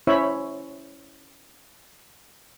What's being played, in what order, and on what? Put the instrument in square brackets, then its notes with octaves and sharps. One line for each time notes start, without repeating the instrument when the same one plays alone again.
[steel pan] C#4 E4 C5 C#5 E5 B5